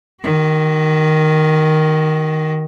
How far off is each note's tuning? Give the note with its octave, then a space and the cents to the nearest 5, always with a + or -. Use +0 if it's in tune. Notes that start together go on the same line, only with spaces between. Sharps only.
D#3 +0 F#4 +40